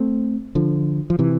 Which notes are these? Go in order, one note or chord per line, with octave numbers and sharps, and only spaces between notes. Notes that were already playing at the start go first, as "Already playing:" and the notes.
Already playing: A3 C4
D3 F3
F3
C3 E3